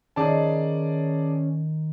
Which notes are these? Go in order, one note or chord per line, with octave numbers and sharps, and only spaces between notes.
D#3 C#4 G#4 D5 A5